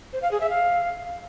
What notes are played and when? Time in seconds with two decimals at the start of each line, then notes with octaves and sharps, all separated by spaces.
0.13 C5
0.22 F5
0.31 G#4
0.41 E5
0.50 F5